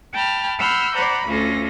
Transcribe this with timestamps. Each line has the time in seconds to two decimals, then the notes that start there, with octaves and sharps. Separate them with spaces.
0.12 G5 A5 B5 F6
0.59 F#5 B5 C6 E6 F6 G6
0.94 C5 D5 F#5 A#5 B5
1.26 D2 C#4 F4 A4 A#6